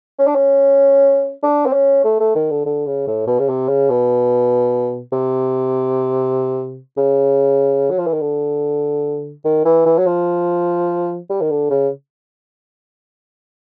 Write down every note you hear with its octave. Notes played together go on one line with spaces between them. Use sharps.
C#4
D4
C#4
D4
C4
C#4
A3
A3
D#3
D3
D3
C#3
A2
B2
C#3
C3
C#3
B2
C3
C#3
F#3
F3
E3
D#3
D3
D#3
E3
E3
F#3
F3
G3
D#3
D3
C#3